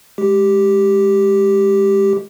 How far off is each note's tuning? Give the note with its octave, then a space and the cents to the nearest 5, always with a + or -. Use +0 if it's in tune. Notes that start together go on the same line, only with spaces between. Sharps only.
G#3 +0 G4 +0